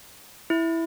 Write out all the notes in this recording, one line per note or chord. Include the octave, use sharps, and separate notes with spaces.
E4